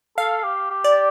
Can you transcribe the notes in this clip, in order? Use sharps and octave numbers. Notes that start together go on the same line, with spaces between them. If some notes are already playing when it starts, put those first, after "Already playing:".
A4 F5
G4
G4
D5